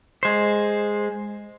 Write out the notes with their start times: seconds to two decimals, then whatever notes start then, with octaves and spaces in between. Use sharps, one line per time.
0.23 G#3 C5